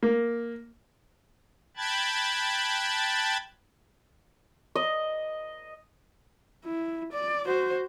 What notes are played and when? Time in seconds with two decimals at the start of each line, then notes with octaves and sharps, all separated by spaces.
0.03 A#3
1.77 G5 A5 B5 F#6 G#6 A6
4.75 D#5
6.65 E4
7.13 D5
7.46 F#4 C5